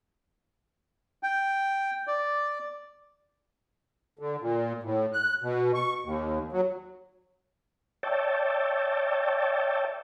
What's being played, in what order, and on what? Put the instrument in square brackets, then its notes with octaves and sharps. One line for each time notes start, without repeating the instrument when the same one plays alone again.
[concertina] G5
D5
[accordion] D3
A#2
A2
F#6
B2
C#6
D#2
F#3
[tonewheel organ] C#5 D5 E5 G5 A5